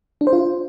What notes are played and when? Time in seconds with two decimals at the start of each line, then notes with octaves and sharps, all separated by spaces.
0.21 D4
0.27 C5
0.33 F4